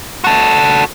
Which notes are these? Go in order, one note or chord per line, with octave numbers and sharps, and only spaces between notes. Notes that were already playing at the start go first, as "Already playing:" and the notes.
F#4 A4